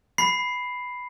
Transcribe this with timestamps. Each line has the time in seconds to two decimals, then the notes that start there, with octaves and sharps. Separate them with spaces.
0.18 B5 C7